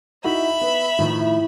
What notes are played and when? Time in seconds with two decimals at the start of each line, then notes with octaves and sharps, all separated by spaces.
0.24 D#4 E4 F#4 E5 B5
0.61 B3
0.99 A2 D#3 F3